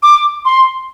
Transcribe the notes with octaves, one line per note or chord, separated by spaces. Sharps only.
D6
C6